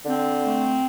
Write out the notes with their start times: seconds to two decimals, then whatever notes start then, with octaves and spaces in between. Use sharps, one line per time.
0.06 D3 C4
0.44 A3